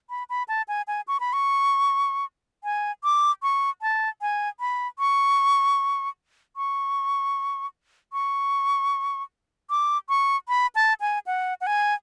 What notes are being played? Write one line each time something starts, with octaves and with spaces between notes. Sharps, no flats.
B5
B5
A5
G#5
G#5
C#6
B5
C#6
G#5
D6
C#6
A5
G#5
B5
C#6
C#6
C#6
D6
C#6
B5
A5
G#5
F#5
F#5
G#5